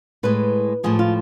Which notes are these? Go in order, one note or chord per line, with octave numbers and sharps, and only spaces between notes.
A2 G#3 B4
A2 F3 G#3 G#4
F4